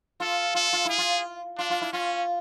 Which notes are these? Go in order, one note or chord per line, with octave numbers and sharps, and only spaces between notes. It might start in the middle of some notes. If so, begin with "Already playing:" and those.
F4 A4
F4 A4
F4
E4 G#4
F4
D4 F4
F4
E4
C#4 F4